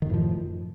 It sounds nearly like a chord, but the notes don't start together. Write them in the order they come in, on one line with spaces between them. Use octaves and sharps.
D#3 F#2 A2 F3